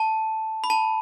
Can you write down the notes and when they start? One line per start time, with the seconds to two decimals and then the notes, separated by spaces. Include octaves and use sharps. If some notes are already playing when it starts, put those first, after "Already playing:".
Already playing: A5
0.64 B5
0.70 A5